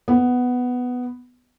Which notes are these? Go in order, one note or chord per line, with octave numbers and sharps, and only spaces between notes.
B3